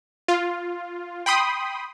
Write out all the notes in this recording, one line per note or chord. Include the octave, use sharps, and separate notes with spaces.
F4
G5 B5 C6 D#6